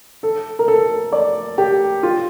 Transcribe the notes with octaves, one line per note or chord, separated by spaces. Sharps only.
A4
A#4
A4
D5
G4
F4